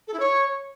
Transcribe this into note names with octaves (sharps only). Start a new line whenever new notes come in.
A4
E4
C#5